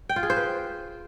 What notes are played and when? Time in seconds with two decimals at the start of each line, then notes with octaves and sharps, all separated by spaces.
0.09 G5
0.16 F4
0.23 G#4
0.30 C5
0.36 B4